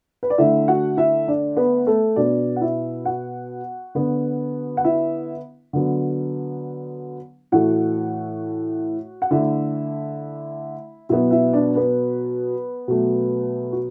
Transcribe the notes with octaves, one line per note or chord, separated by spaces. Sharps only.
B4
D5
D3 A3 E4 E5
F#4 F#5
E4 E5
D4 D5
B3 B4
A3 A4
B2 B3 D4 D5
F#5
E4 E5
F#4 F#5
D3 B3
F#5
E4 E5
D3 F#3 B3
A2 E3 A3 F#4 F#5
F#5
D3 A3 E4 E5
B2 F#3 B3 E4 E5
E4 E5
D4 D5
B3 B4
B2 F#3 A3
F#4